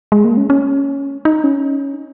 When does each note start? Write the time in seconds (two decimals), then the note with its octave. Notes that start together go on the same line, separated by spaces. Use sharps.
0.12 G#3
0.25 A#3
0.37 C#4
0.50 C#4
1.25 D#4
1.44 C#4